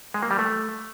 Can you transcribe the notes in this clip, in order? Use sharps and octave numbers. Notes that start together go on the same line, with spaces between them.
G#3
A#3
G3
A3